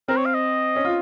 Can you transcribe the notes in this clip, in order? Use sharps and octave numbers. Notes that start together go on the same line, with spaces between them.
C4 A#4
C#5
F5
D#5
C#4
F4